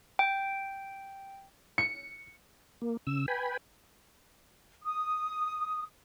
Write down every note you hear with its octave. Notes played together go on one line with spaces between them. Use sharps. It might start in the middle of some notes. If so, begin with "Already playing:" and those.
G5
C#7
A#3
C#3 E6
B4 G5 G#5 B5
D#6